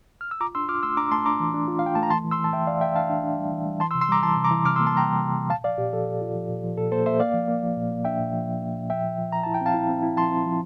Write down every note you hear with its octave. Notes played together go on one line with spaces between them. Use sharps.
F6
E6
F4 A#5 D6
D4 C6 E6
F4 D6 F6
A3 C6 E6
D4 A#5 D6
A3 A5 C6
D4 A#5 D6
E3
D4
F4
F5
F4 G5
A3 A5
A#5
E3 A5 C6
E3
C6 E6
E3
A5
E3 E5 G5
E3 D5 F5
E3 E5 G5
D4 F5 A5
D4
D4
G3
E3
G3
E3 A5 C6
C6 E6
C3
C6 E6
G3 A#5 D6
E3 A5 C6
C3
A#5 D6
E3
C3 D6 F6
C6 E6
A#3
A5 C6
G3 G5 A#5
G3
C3
C3
A#2 F5 A5
F3 D5 F5
A#2 G4
F3 A4
A#2
F4
F3
A#2
F3
A#2 A4
A#3 A4 C5
A#3 C5 E5
A#3 D5 F5
F3
A#3
F3
A#2
A#3
D4 E5 G5
A#2
F3
F3
A#3
A#2
F3 E5 G5
F3
F3
F3 A#5
E4 A5
G5
C4 F5 A5
E4
C4
E4
F3 A5 C6
C4
F3